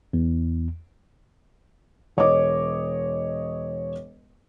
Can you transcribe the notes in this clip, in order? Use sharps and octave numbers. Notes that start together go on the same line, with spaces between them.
E2
E1 C#5 D#5 D6